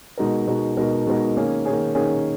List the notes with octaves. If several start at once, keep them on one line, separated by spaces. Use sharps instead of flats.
B2 G#3 D#4 F#4 A#4
B2 G#3 D#4 F#4 A#4
B2 G#3 D#4 F#4 A#4
B2 G#3 D#4 F#4 A#4
D#3 A#3 C#4 G#4
D#3 A#3 C#4 G#4
D#3 A#3 C#4 G#4